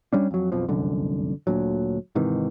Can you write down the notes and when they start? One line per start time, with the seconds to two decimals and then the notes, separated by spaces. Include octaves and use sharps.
0.13 G3 C#4 D4
0.31 F2 F#3
0.52 B1 F2 B2 F3
0.69 F1 C2 F#2 D3
1.47 D2 A#2 D3 F#3
2.15 G#2 C3 D#3 E3